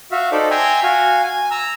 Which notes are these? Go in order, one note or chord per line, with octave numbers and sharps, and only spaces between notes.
F#4 E5 F5
D#4 A4 C5 D5
E5 G5 G#5 A#5 C6
F#4 F5 G#5
G#5
A#5 E6